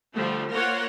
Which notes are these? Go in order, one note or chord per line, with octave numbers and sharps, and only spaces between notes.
D3 F3 G3 A3
A#3 F4 A#4 C5 C#5 F#5